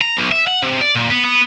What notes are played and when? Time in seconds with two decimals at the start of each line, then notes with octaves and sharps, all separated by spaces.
0.02 A#5
0.17 B1
0.32 E5
0.47 F#5
0.63 C3
0.81 D5
0.95 A#2
1.10 B3
1.25 B3